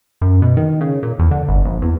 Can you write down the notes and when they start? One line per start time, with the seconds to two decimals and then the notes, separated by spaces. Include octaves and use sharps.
0.21 F#2
0.42 B2
0.57 D#3
0.81 C#3
1.03 A#2
1.19 E2
1.31 D3
1.48 G1
1.65 A#1
1.82 E2